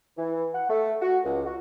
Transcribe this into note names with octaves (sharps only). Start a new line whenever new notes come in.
E3
F#5
A3
F#4
C#2
F#4